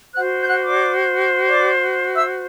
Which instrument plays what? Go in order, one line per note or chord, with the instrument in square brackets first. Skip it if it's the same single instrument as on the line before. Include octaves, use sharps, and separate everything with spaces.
[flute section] F#4 C5 F#5 F#6
G6
F#5 F#6
D5 D6
D5 D6
E5 E6